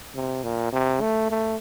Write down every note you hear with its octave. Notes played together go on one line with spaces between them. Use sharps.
C3
A#2
C3
A3
A3